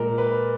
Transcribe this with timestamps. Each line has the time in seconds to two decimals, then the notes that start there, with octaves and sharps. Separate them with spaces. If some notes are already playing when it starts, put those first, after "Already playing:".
Already playing: A#2 G#3 A#4
0.18 B4